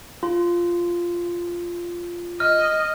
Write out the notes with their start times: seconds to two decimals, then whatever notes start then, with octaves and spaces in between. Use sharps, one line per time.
0.23 F4
2.40 D#5 F6